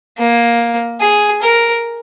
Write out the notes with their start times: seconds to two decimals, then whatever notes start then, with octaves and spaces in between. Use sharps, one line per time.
0.18 A#3
1.01 G#4
1.42 A#4